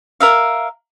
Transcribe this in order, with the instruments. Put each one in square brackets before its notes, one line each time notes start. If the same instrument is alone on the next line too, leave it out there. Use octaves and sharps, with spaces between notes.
[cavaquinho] A#4 E5 F5